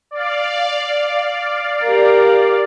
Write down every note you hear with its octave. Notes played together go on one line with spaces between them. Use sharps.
D5 F5
G4 A#4